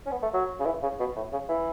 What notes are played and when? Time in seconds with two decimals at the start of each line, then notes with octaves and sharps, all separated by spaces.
0.07 C#4
0.12 B3
0.22 A3
0.34 F#3
0.60 C#3
0.66 E3
0.83 C#3
1.00 B2
1.16 A2
1.33 C#3
1.49 E3